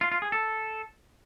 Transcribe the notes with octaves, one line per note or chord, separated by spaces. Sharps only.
F4
F4
G#4
A4